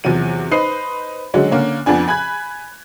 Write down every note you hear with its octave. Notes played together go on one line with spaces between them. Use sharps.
E2 C3 F3 F#3 D#7
D#4 B4 C5 D#6 C7
D3 F#3 G#3 C#4
D3 A#3 C#4
F2 B3 D4 G#5
G#5 B5 F#6 G#6